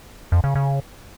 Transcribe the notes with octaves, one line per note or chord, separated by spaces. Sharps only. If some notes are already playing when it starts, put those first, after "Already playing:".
F2
C#3
C#3